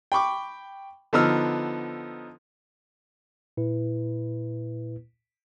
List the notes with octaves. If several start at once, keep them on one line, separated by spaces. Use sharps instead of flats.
G5 B5 C#6 D6
D3 F3 B3 D#4 E6 F6
A#2 E4 B4